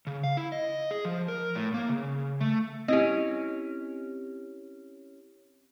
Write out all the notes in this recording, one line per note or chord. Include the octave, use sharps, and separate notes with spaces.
C#3
F5
E4
D#5
G#4
F3
A#4
A2
A#3
C#3
A3
C4 C#4 E4 G4 D#5